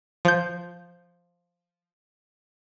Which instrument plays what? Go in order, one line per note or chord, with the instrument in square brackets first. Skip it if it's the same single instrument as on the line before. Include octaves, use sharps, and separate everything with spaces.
[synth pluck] F3 G6